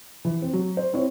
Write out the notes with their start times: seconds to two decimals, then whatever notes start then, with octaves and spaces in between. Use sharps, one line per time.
0.25 E3
0.42 C4
0.53 F#3
0.77 C5
0.93 C4 E4 C5 C#5